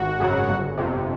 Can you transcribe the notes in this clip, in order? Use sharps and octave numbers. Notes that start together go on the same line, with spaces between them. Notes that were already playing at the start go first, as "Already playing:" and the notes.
Already playing: G#1 F#4
F#2 C#3 F#3
G1
F2 C3